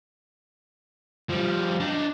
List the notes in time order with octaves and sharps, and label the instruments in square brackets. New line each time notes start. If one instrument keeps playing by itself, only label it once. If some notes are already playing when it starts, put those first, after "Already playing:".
[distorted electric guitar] F3 G3
D4 D#4